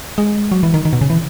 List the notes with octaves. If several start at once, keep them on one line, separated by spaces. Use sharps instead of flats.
G#3
F#3
E3
D#3
D#3
B2
C#3
E3